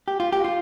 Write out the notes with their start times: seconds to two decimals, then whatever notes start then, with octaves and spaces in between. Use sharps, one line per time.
0.08 G4
0.20 F4
0.32 G4
0.44 F4